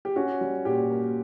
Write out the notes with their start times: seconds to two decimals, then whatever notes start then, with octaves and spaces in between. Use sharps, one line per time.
0.05 G4
0.16 C#4 F#4
0.41 G3
0.65 A#2 G4
0.90 A#3